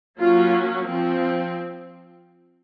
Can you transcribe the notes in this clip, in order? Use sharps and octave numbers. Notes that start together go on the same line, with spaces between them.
F#3 A#3 C#4 F4
F3 C4